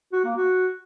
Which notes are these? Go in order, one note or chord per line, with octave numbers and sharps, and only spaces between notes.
F#4
A#3
F#4